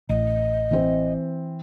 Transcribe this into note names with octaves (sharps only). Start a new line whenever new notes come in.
A1 D#5
E3 C4